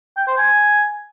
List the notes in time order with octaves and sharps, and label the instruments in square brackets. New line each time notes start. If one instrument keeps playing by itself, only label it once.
[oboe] G5
C5
G#5